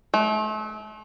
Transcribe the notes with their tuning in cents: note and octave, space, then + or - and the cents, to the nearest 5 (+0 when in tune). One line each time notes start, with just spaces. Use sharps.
A3 -40